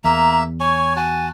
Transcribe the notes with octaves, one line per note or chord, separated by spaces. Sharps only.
E2 A#3 E5 A#5
C#5 G#5 C#6
F#4 G#5 A5